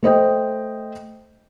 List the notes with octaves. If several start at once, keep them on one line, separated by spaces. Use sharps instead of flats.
A3 C5 D#5 G5